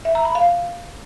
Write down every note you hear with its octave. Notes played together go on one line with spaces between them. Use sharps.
E5
A#5
B5
F5